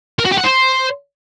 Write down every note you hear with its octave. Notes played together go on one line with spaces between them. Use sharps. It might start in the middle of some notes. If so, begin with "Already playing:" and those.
A#4
F#4
G4
F#5
C5